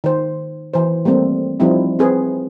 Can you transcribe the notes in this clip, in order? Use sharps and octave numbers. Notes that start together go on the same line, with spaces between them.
D#3 C5
E3 C5
G3 A3 A#3 C4
F3 G3 C4 D#4 E4
C4 G#4 B4